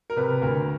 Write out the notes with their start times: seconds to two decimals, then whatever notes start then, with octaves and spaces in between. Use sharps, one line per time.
0.10 A#4
0.16 C3 B4
0.42 D2 A#4